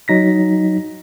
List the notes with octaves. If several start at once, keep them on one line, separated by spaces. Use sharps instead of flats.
F#3 D#4 A#6 B6